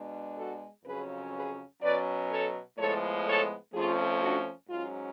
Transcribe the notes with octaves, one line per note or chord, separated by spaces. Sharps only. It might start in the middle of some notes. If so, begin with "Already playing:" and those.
Already playing: B2 G#3 D4
F#4 A4
F2 C#3 F#3 C#4 G#4 B4
G#4 B4
B2 F#3 C#4 B4 D5
A4 C#5
A2 F3 G#3 B3 A4 C#5
A4 C#5
F2 F3 A3 C#4 F4 G#4
D4 F#4
G#2 F#3 C#4 F4